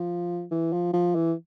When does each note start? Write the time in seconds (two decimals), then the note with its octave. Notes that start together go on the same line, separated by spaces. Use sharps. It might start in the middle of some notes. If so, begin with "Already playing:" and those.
Already playing: F3
0.51 E3
0.73 F3
0.94 F3
1.15 E3